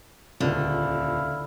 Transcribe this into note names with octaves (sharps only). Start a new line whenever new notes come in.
D#1 C#2 D3 E4 F4 F5